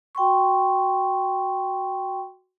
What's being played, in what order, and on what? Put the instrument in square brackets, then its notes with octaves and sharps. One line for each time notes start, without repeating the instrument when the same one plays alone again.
[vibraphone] F#4 G5 C6 C#6